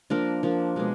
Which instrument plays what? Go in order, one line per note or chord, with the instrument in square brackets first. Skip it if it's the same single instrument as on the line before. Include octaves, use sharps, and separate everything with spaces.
[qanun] F3 A#3 D4 A#4
F3 A#3 D4
B2 G#3 D4